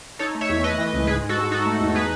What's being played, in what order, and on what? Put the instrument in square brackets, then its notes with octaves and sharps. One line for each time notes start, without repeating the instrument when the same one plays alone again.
[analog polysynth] D#4 A4 C#5
A3
C#5 E5
E2
A3 B4 D#5
E3
C#2
G#2 G#4 B4
G#3
F#4 A4
G#2
D#4 F#4 A4
A3
E2
D#4 G#4 B4